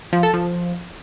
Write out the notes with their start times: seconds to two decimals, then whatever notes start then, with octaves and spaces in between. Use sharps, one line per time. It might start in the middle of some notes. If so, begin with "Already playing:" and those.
0.13 F3
0.23 A4
0.34 F3